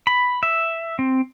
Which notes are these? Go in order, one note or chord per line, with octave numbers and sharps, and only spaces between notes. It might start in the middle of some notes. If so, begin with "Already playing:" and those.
B5
E5
C4